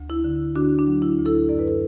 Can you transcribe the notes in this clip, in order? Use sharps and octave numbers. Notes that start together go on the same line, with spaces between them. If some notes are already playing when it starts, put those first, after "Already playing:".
Already playing: D2
E4
D3
D3 D4 F#4
D4
F#3
E4
D2
E4 A4
F#2 D5
B4
A4